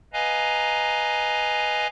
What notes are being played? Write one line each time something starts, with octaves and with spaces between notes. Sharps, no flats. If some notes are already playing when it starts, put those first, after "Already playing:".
B4 D#5 F5 G#5 A#5